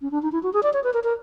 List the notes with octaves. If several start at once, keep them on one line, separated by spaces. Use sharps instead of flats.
C#4
D4
D#4
E4
F#4
G#4
D5
C#5
B4
A#4
A#4